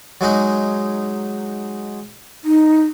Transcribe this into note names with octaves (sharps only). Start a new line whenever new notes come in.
F#3 G#3 D#4
D#4